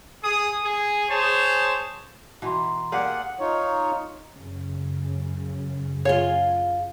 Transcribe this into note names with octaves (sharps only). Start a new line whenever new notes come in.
G#4 D#6
G#4
G#4 C5 C#5 A5
B2 E3 A#5 C6
A#3 G4 G#4 D5 F#5
D#4 F4 C#5
F#2 C#3
F4 G#4 C#5 F5